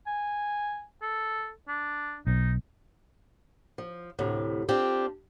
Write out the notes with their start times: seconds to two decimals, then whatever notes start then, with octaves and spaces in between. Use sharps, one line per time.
0.07 G#5
1.02 A4
1.68 D4
2.27 B1 D#4
3.78 F3
4.19 D2 A2 C3
4.69 C4 D4 F4 G4